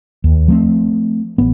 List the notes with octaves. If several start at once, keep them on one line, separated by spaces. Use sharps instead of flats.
D#2
F3 A3 C4
A1 B3